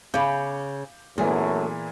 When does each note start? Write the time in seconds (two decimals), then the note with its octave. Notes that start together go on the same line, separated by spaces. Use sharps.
0.14 C#3 C#4 F5 B5 D6 G6
1.18 F#2 A#2 E3 A3 B3 G#4